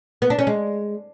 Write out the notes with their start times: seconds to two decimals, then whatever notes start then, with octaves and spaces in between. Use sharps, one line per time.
0.22 B3
0.30 D4
0.39 C#4
0.47 G#3